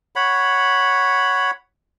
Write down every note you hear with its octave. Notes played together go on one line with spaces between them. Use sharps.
C#5 F#5 B5